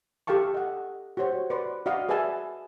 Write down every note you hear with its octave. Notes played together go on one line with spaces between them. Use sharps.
G4 A4 F5 A5 C#6
D#5 F#5
F#4 G4 C5 C#5
B4 D5 C6
F#4 D5 D#5 F5
G#4 B4 D5 E5 G#5 A5